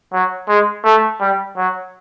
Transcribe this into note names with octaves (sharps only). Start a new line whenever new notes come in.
F#3
G#3
A3
G3
F#3